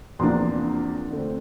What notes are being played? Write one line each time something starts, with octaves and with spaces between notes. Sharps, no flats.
E2 C3 F3 A#3 D4 C6
D3 A3 C4